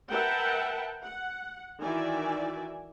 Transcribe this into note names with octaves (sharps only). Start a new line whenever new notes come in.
A#4 B4 E5 F#5 G5 A5
F#5
D#3 E3 F#4 D5 E5 G#5